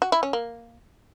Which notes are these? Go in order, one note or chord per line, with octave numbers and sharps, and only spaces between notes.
F#4
E4
C#4
A#3